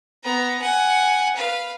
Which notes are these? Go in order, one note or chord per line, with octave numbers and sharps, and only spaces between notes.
B3 A#5
F#5 G#5
B4 F5